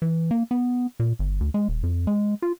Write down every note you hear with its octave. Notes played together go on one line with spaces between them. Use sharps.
E3
A#3
B3
A#2
G1
D2
G#3
D#1
F2
G#3
F4